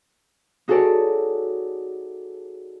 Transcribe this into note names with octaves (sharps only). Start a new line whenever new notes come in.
D#4 F#4 G#4 A4 C#5 D5